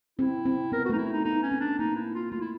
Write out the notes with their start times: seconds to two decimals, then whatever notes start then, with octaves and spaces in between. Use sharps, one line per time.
0.19 C4 E4
0.46 C4
0.72 B3 A#4
0.85 A3 F#4
0.93 D#4
0.98 E4
1.13 D#4
1.25 B3 D#4
1.43 C#4
1.52 C4
1.60 D4
1.79 A#3 D#4
1.96 E4
2.15 F4
2.31 A3 F4
2.41 E4